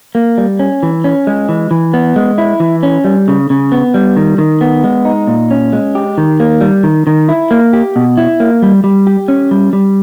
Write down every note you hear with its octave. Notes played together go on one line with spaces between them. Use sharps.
A#3
G3
C#4
E3
C#4
G#3
E3
E3
B3
G#3
E4
E3
C#4
G3
C#3
C#3
B3
G3
D#3
D#3
B3
G#3
D#4
A#2
C#4
G#3
G4
D#3
A#3
G3
D#3
D#3
E4
A#3
G4
B2
E4
A#3
G3
G3
G4
C#4
G3
G3